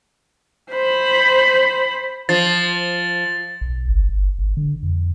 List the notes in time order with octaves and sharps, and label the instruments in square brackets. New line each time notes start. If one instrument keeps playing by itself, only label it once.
[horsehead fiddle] C5 B5
[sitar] F3 [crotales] A6
[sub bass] B1
G1
G1
G#1
D3
F2